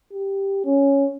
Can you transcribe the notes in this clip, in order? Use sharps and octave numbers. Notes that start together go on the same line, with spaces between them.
G4
C#4